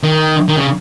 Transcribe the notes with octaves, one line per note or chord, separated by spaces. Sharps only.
D#3
D#3
C#3